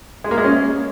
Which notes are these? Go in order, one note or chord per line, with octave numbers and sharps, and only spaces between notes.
G#3
A#3
G#3
C#4